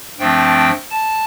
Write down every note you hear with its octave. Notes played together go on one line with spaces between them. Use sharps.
G2 F3 A3 C4 G5
A5